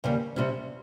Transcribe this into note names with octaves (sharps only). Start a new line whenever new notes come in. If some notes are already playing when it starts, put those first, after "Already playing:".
D#2 C#3 G3
C3 G3 C#4